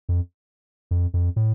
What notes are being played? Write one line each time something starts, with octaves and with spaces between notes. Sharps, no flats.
F2
F2
F2
A2